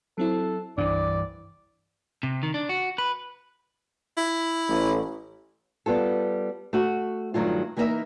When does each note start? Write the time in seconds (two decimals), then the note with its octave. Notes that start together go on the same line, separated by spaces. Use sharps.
0.18 F#3 C4 E4 A4
0.78 G1 C2 G2 E3 D4 D5
2.23 C3
2.43 D#3
2.54 D4
2.69 F#4
2.98 B4
4.17 E4
4.68 A1
5.86 G3 B3 F4 A4
6.73 A3 F#4
7.34 G2 D#3 F#3 A3 F4
7.77 E3 A#3 D#4 F#4 A#4 E5